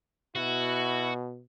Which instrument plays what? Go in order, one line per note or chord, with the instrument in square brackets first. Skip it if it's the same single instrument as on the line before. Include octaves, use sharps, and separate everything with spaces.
[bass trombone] B2 [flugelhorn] E4 [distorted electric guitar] F#4